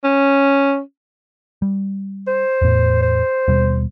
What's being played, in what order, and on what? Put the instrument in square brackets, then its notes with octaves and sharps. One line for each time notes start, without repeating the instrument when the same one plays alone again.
[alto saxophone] C#4
[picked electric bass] G3
[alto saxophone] C5
[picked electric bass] E2 A2
[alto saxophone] C5
[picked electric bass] D#2 B2 G3